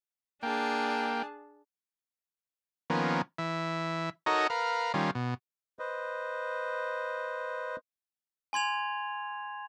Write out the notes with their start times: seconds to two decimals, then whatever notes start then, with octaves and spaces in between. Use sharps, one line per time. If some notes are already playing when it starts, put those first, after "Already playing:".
0.43 A#3 D4 G#4 G5 A5
2.90 D#3 F3 A#3 B3 C#4
3.38 E3 E5
4.26 D#4 F#4 A4 A#4 C#5 D#5
4.50 A#4 B4 F5
4.94 D#3 G3 C#4 F4
5.15 B2
5.79 B4 C5 D#5
8.53 G#5 C6 G#6 F7